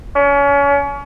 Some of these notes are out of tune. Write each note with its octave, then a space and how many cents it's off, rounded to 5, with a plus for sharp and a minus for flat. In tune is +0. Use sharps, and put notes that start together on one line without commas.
C#4 +35